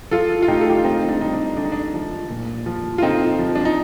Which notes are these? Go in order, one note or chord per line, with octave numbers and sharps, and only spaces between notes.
F3 F4 A4
F4
A2 D#4 G4
A4
G4
F4
D3 C4 D#4
D4
G3 D#4
D4
D3 D4
D#4
D4
F3
A#2
F3
F4
D3 C4 D#4
F3
D4
D#4